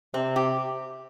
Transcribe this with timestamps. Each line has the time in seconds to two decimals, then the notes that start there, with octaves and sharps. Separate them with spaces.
0.14 C3 C4
0.36 G4